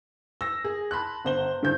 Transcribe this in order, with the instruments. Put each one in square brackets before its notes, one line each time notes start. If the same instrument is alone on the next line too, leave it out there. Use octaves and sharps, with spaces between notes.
[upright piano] E6 A#6
G#4
A5 B5 C6 F#6
G1 C5 G7
G2 D3 C5 G6